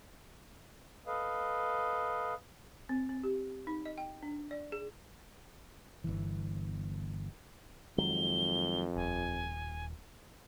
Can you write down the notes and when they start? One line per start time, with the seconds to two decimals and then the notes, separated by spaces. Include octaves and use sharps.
1.07 A4 B4 D#5 F5
2.89 C4
3.09 C4
3.23 G4
3.67 D#4
3.85 D#5
3.98 G5
4.23 D4
4.51 D5
4.72 G#4
6.04 G1 C#2 E3
7.98 F2 D#3 F#3 G#3 G7
8.96 D#1 G#5